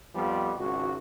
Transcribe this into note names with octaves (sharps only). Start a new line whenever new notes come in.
F2 F3 G3 B3
G#1 C#2 F#4